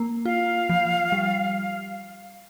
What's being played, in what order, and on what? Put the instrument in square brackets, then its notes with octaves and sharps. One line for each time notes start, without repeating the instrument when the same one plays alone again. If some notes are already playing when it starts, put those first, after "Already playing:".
Already playing: [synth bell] A#3
[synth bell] F4 [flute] F5
[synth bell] F3
G3